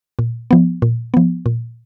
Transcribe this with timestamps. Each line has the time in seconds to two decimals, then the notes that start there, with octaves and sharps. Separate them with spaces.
0.19 A#2
0.51 F3 B3
0.82 A#2
1.14 F3 B3
1.46 A#2